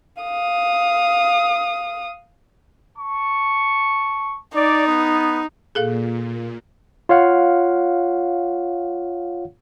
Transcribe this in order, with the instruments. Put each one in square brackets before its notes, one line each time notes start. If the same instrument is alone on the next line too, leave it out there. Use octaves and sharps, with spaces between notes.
[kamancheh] F5 D#6
[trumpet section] A5 C#6
[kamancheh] D#4 [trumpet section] D5
[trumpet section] B3
[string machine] A#2 [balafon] G#4 A4 F5
[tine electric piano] F4 C#5 F5 F#5